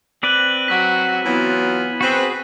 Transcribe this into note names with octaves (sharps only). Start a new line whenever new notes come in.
C4 B4 D5 F#6 D#7 F#7
F#3 F#4 B6
E3 F#3 B3 F4
C4 F#4 G#4 B4